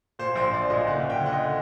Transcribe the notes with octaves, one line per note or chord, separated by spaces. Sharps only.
A#2 C5
A#1 C5
A#1 D5
A#2 D#5
F#1 F#5
F#1
G5
D3
F#5
D#5